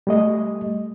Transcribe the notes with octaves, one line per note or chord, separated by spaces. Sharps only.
G3 A3 D#5